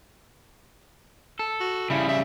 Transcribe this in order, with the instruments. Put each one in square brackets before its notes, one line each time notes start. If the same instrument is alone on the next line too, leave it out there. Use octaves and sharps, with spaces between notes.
[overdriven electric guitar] A4
[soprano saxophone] F#4
[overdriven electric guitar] C#3 G3 [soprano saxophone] E4
[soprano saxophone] E5